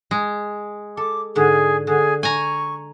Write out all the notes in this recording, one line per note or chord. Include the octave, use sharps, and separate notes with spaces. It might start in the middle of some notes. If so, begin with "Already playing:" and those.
G#3
A4 D6
G#2 D3 G#4 D5
D3 G#4
G#5 A#5 C#6